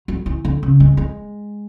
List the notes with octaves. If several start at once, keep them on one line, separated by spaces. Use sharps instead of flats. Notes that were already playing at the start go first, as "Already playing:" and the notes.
F#3
E3
D3
C#3
G#3
G#3